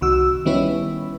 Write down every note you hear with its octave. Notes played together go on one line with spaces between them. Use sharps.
C2 D#3 F#4 E6
D#3 G3 B3 C#4 E4 B4